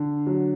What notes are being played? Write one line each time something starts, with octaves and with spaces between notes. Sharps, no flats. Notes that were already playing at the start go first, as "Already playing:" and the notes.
Already playing: D3
F#3